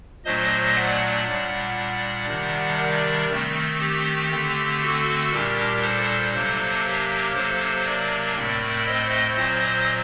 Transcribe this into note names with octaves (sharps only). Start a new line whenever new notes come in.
A#2 F#3 A3 D4 C5 D#5
D5 F#5
A#2 G3 D4
C3 D#3 G3 D4
A#4 D5
D#3 A3 C4
G4
D3 A3 C4
F#4 A4
A#2 G3 D4 G4 A#4
A4 C5
C3 F#3 A#3 D4 A4 C5
G4 A#4
C3 F#3 A#3 D4 A4 C5
A#4 D5
A2 A3 C4 A#4 D5
C5 D#5
A#2 F#3 C4